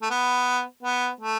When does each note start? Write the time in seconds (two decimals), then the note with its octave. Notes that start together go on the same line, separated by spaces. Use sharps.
0.02 A3
0.10 B3
0.83 B3
1.21 A3